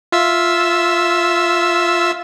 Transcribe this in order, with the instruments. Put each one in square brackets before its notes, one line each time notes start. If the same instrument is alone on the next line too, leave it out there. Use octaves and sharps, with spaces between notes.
[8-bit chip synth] F4 E5 E6